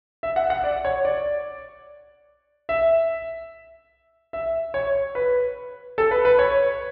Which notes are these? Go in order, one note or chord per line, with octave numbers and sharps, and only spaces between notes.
E5
F#5
F#5
D5
C#5
D5
E5
E5
C#5
B4
A4
B4
B4
C#5